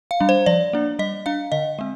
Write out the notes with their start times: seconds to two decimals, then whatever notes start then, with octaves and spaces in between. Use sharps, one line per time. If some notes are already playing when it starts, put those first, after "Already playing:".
0.11 F5
0.20 G3 D4
0.29 C5
0.46 F3 D5
0.73 A#3 D4
0.99 G3 D#5
1.26 D4 F5
1.52 D3 D#5
1.79 G#3 C4